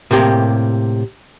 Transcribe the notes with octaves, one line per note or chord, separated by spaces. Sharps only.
A2 C3 A#3 G4